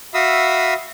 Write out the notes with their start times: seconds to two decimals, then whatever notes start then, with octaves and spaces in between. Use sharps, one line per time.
0.14 F#4 E5 F5 B5 D#6 E6